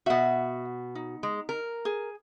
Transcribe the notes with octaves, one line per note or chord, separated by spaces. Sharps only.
B2 F#4 E5 F#5
D#4
G#3
A#4
G#4